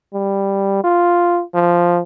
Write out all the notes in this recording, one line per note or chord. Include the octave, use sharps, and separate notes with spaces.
G3
F4
F3